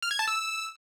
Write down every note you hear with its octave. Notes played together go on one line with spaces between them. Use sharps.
F6
G#6
A5
E6